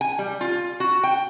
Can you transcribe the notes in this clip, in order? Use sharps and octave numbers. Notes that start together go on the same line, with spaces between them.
G#5
G3
F4
F#4
G5